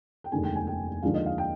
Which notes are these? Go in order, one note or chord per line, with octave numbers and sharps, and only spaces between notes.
G5
F1 D#2 D3 G#3 G#5
G5
G#5
G5
D#2 D3 F3 G#3 F5
D#5
F5
G5